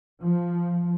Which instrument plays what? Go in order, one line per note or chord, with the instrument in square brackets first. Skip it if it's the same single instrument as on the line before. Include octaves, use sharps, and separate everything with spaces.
[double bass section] F3